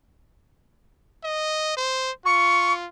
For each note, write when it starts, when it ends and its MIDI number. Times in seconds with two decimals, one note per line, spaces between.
1.24 1.73 75
1.77 2.11 72
2.25 2.88 65
2.25 2.73 85